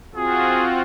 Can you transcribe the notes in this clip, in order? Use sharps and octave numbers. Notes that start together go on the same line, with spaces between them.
C4 F4 F#4 G#4